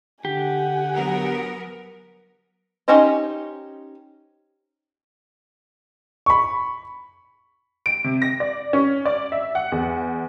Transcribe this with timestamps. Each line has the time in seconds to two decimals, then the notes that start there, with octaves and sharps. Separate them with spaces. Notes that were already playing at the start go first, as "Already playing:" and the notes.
0.25 D3 G4 F#5 G#5
0.94 F#3 B3 A#4
2.88 C#4 D#4 G4 C5 D#5
6.26 B5 C#6
7.86 D7
8.04 C3
8.22 A#6
8.40 D5
8.73 C#4
9.05 D5
9.32 E5
9.55 F#5
9.72 E2